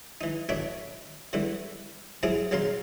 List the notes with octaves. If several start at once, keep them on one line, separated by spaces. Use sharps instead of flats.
E3 D#4
A1 D2 B2 D4 C#5 E5
D3 E3 G3 B3 E4
C3 F#3 C4 E4 F4 G#4
A#1 C#3 F#3 F5 A#5 C6